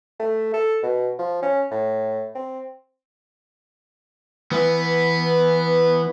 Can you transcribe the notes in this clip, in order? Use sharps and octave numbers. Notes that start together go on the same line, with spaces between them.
A3
A4
B2
F3
C#4
A2
C4
E3 B3